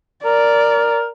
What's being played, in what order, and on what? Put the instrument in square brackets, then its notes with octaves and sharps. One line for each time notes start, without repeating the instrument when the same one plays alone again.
[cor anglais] A#4 [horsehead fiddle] D5